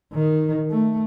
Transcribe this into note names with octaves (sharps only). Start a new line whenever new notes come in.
D#3
A3